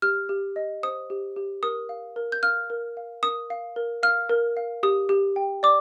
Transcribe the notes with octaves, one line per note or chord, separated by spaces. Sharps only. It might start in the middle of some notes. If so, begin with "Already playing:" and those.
G4 F6
G4
D#5
C5 D#6
G4
G4
A#4 D#6
F5
A#4
G6
F5 F6
A#4
F5
A#4 D#6
F5
A#4
F5 F6
A#4
F5
G4 D#6
G4
G5
D5 D6